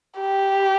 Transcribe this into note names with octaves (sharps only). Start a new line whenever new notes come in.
G4